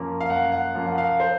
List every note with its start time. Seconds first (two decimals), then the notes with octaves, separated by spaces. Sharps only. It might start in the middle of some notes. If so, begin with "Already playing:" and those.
Already playing: F#2 F3 A#3 C#4
0.21 F5
0.30 F#2 F#5
0.52 F#5
0.75 F3 A#3 C#4
0.86 F#5
0.98 F5
1.20 C5